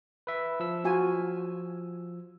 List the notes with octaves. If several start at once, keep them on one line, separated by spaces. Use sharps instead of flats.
B4 E5
F3 E6
F4 F#4 G#5